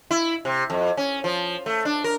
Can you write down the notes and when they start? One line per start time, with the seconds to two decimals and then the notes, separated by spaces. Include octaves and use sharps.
0.11 E4
0.45 C3
0.70 F2
0.97 C#4
1.24 F3
1.66 A3
1.85 D4
2.04 A#4